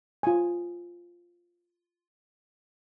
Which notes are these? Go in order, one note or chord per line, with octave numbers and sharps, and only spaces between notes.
F4 G#5